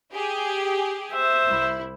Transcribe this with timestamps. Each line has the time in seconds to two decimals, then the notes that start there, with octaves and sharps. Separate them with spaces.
0.13 G4 G#4
1.12 C5 E5
1.46 C2 E4